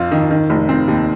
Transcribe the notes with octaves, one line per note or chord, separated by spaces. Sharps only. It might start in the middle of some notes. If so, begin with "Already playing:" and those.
Already playing: F2 C4 F4
D#3
D#3
F1
C4
D#2